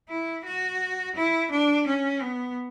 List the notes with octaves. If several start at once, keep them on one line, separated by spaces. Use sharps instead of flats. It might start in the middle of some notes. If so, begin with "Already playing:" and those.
E4
F#4
E4
D4
C#4
B3